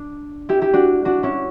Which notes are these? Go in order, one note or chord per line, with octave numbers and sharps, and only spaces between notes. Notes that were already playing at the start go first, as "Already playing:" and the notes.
Already playing: D4
E4 G4
E4 G4
D4 F#4
D4 F#4
C#4 E4